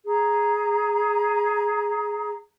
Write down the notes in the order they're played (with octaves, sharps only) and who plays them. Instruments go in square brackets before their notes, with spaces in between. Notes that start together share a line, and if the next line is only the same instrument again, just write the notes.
[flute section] G#4 A#5